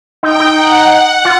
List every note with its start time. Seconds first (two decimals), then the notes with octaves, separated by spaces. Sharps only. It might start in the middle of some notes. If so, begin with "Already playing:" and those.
0.23 D#4 G5
0.40 D#4
0.57 F#5
0.90 F#5
1.25 F4